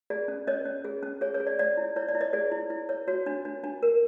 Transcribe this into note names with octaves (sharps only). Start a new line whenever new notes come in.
G#4 D5
C#4
C#4 C#5 D#5
C#4
G#4
C#4
G#4 C#5
C#5
G#4
D5
C#5 D5
E4
E4 C#5
D5
E4
C#5 D#5
G#4 D5
E4
E4
C#5
F#4 C#5
D4
D4
D4
A#4